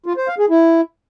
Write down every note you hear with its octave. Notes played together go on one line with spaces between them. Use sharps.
F4
C5
F5
G#4
E4